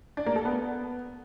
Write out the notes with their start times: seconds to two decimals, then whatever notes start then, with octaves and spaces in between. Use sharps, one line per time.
0.17 D4
0.26 A#3
0.36 A4
0.45 B3